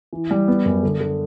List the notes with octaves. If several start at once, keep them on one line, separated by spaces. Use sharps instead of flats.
E3
G3
B3
F#2
D3
D3